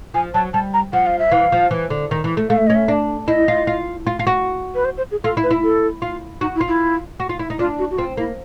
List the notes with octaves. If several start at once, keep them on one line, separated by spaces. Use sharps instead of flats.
F3 G#5
F#3 A5
G3 A5
A#5
F3 F#5
F5
E5
E3 F5
F3
E3
D3
D#3
E3
A3
A3 F5
E5
C#4 D#5
E5
D4
E4 D#5
F4
F4
F4
F4
F#4
B4
C5
C5
G#4
F4 A4
E4
B4
E4
A4
F4
D#4 F#4
E4
F4
E4
F#4
F4
E4
D#4
D4 F4
F#4
F#4
C4 F4
A#3 E4